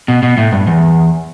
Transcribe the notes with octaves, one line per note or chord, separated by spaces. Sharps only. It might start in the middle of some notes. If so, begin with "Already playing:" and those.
B2
B2
A2
G2
E2